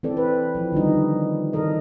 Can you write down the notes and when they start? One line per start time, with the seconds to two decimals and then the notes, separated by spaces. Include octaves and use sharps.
0.03 E3 C4 A4 D5
0.17 B4
0.55 E3 F3
0.72 D3 D#3 G3 D#4
1.53 D#3 E3 D#4 A4 A#4 D#5